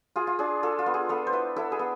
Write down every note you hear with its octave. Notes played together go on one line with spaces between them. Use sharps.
F4 G#4
F4
D4 G#4
F4 A4
F4
B3
G#4
B3 A4
C5
E4 B4
E4 A4
G#4
B3